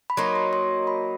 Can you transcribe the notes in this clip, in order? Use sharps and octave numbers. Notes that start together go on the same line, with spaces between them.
B5
F#3 A#3 D#4 C6
C6
C6
B5